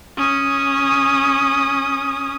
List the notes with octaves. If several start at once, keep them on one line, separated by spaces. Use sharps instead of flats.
C#4 D#6